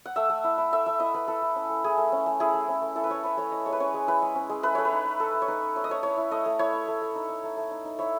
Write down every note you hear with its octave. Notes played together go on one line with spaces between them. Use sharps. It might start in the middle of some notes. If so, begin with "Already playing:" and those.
F#5
A3 E5
A3
E4
E4
A3 E5
A3 E5
E4 D#5
E4 B4
E4 A4
A3
C#4
A3
E4 G#4
A3
C#4
A3
E4 G#4
A3
C#4
A3
E4 A4
B4
A3 C#5
C#4 B4
A3 C#5
E4 D#5
G#3 C#5
B4
C#4 C#5
G#3
E4 B4
G#3
C#4
G#3
A3 B4
A3 C#5
B4
D#4
D#4
A3 A4
A3
C#5
D#4 B4
D#4
A3 C#5
D#5
A3 C#5
E4 C#5
E4
A3 D#5
A3
E4 C#5
E4
A3
A3
D#4
D#4
A3
A3
D#4
D#4
E4 C#5